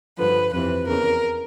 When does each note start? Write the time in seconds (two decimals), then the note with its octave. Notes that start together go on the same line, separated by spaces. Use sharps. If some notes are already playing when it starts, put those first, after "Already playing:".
0.17 G2 D3 F3 B4
0.52 F2 C3 E3 B4
0.87 E2 C#3 E3 A#4